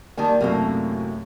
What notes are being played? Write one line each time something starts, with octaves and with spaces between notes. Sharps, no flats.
D#3 G3 A#3 G#5
F#2 A2 C3 F#3 A3 A#3